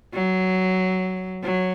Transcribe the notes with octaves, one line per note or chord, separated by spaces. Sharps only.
F#3
F#3